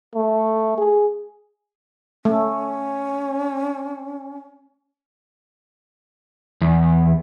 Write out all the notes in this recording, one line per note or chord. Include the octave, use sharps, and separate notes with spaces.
A3
G#4
A3 C#4
E2